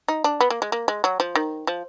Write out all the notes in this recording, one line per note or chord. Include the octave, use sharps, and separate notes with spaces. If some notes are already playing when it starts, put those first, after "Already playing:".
D#4
D4
B3
A#3
G#3
A#3
G#3
F#3
F3
D#3
F3